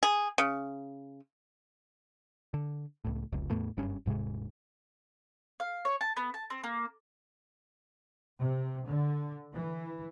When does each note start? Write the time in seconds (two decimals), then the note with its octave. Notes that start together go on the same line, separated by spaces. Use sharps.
0.03 G#4
0.38 C#3
2.54 D3
3.05 C#2 A2
3.33 F1 C#2
3.50 E2 A2 A3 B3
3.77 F#1 G2 C#4
4.06 D#1 G#2 C3 G#3
5.60 F5
5.85 C#5
6.01 A5
6.17 B3
6.34 A5
6.50 C4
6.64 A#3
8.39 C3
8.88 D3
9.54 E3